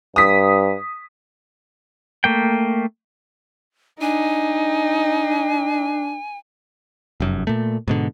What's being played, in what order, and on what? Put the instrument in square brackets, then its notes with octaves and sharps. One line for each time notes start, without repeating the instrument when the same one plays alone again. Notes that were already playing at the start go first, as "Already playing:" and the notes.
[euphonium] G2 [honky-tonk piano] D#6 B6
[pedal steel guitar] A3 A#3 G5
[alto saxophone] D4 [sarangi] D#4 [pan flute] G#5
[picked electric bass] F1 F#2
A#2 A3
G#2 B2 D3